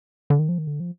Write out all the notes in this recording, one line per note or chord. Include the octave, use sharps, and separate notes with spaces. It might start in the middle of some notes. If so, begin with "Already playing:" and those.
D3
D#3
F3
D#3
D3
F3